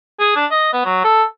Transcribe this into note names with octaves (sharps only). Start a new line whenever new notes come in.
G#4
D4
D#5
B3
F#3
A4